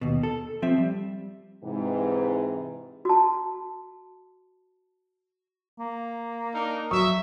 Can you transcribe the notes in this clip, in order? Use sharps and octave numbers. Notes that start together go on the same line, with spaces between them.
D#2 B2
A4
F3 C4 E5
G3
G#2 C3 E3
F#4 A5
A#3
D4 D#4 A#4
F#3 E5 C#6 D#6